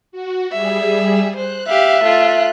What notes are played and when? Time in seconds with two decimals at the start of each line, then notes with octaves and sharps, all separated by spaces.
0.12 F#4
0.52 G3 G#4 E5
1.36 C5 F#6
1.68 G4 E5 F5
2.03 A3 F4